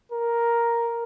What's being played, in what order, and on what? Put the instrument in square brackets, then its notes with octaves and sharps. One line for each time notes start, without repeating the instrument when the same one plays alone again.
[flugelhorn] A#4